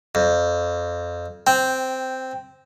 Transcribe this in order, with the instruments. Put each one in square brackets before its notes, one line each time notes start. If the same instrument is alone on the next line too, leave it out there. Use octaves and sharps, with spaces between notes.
[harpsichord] F2
[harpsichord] C4 [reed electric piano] G5